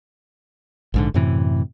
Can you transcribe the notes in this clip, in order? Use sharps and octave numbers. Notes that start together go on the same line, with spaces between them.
A#1 G#2 D3
F#2 A2 C3 E3